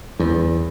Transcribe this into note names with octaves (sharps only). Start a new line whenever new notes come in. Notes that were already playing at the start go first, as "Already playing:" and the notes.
E2